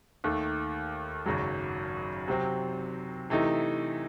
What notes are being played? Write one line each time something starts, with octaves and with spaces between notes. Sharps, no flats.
D#2 D#3 A3
G#1 F#2 C#3 F#3
C3 F#3 C4
C3 E3 A3 D#4